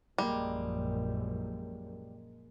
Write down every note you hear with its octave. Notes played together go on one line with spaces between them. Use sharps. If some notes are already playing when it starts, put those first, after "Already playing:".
A#1 F#2 G3 G#3 A#3 D#5